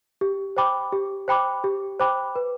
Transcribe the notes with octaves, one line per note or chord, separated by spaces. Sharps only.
G4
C5 G5 B5 D6
G4
C5 G5 B5 D6
G4
C5 G5 B5 D6
B4